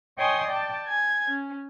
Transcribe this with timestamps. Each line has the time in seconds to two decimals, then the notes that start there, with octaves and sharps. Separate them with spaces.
0.17 C#5 D#5 G5 G#5 C6 D#6
0.48 D5 G5 A5
0.86 G#5 G#6
1.27 C#4